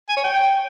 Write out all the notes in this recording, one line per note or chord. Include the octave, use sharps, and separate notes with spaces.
G#5
C#5
G5